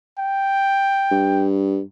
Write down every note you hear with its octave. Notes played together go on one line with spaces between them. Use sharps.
G5
G2